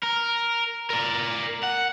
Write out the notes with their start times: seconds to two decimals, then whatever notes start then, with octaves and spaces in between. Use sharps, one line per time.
0.03 A#4
0.90 A#4 D5
1.63 F#5